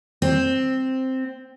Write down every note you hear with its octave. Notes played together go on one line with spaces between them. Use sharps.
C4